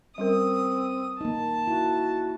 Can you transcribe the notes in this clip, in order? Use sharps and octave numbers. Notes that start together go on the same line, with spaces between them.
G3 C4 C#4 A#4 D#6
A#3 D#4 A5
E4 F#4